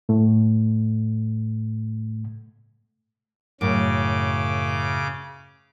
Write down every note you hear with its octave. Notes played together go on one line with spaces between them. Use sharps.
A2 A3
F#2 A2 C#3 D6